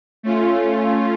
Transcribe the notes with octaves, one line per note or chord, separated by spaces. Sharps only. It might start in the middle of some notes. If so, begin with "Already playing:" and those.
A3 C#4 F4